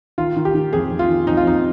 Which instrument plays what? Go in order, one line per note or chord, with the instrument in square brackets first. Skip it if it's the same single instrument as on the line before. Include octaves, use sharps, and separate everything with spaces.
[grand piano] D#3 F4
D#3
G4
D#3
F2 G#4
F2
F4
D#3
F2 D#4
F4
F2 D#4